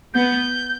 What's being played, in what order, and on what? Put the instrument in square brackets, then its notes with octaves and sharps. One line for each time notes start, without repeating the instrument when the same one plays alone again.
[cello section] B3 [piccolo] G6